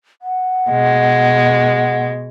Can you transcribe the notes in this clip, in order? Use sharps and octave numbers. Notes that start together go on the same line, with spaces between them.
F#5
B2 G#3